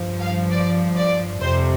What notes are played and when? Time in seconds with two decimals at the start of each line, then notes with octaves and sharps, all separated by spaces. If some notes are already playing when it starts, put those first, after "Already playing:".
Already playing: G2 F3
0.20 F5
0.50 D5
0.96 D5
1.40 F2 C3 G3 C5